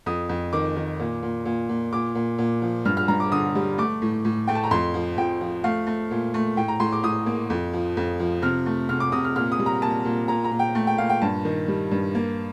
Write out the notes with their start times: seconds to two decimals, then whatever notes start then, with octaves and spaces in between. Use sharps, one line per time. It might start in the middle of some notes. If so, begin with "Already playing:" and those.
0.06 F2 D#6
0.29 F2
0.53 D#3 D6
0.77 D#3
1.00 A#2
1.23 A#2
1.46 A#2
1.69 A#2
1.93 A#2 D6
2.15 A#2
2.39 A#2
2.62 F3
2.85 G2 F6
2.97 F6
3.08 G2 A#5
3.20 D6
3.32 D3 D#6
3.55 G3
3.78 A3 D6
4.02 A2
4.25 A2
4.47 A3 G5
4.55 A5
4.64 A#5
4.71 F2 C6
4.94 F3
5.18 F2 G5
5.41 F3
5.64 A3 F5
5.87 A3
6.11 A#2
6.34 A3
6.57 A2 G5
6.68 A#5
6.80 A2 C6
6.92 D6
7.03 A2 D#6
7.26 A#3
7.50 F2
7.73 F3
7.97 F2
8.20 F3
8.42 C3 F6
8.66 A3
8.89 C3 F6
9.00 D6
9.12 C3 D#6
9.24 F6
9.36 A#2 F6
9.52 D#6
9.59 G3
9.66 A#5
9.82 A#2 A5
10.05 A#2
10.28 A#2 A#5
10.44 A#5
10.51 A#2
10.59 G5
10.75 A3
10.87 G5
10.98 A#2 F5
11.10 G5
11.22 G2 A5
11.45 D#3
11.68 G3
11.91 G2
12.15 A#3